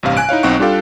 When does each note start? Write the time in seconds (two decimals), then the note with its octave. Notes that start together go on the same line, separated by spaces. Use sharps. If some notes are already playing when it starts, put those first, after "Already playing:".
0.03 A1 G2 C3 F5
0.17 G#5 F#6 D7
0.29 D#4 E4 C#5 F5
0.43 B1 C4 D#4 F#5 C#6 D7
0.59 G3 D4 F4 G4 A4 F5